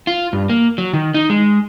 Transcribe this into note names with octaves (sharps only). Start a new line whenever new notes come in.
F4
G2
A#3
F#3
D#3
D#4
G#3